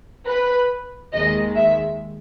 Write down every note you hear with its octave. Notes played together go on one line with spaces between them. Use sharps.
B4
D#2 D#3 G#3 D#5
E5